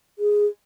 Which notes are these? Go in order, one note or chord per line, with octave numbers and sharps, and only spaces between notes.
G#4